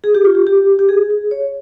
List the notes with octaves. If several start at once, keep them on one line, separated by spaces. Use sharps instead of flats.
G#4
G4
F4
G4
G4
G4
G#4
G#4
C#5